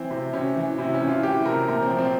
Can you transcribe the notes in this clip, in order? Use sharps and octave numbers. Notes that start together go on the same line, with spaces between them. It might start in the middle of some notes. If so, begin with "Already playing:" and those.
Already playing: E3 C4
C3
C3 C#4
E3
C3 E4
C#4
E3
F4
E3 G4
C3 A#4
A#2 A#4
C4
F3
C4